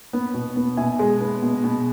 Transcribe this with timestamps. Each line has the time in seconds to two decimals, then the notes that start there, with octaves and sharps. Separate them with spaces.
0.13 B3
0.34 B2
0.56 B3
0.77 B2 E5 G#5
0.99 G#3
1.21 B3
1.43 B2
1.64 B2